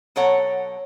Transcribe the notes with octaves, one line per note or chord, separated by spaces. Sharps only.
B2 F#3 A4 C#5 F#5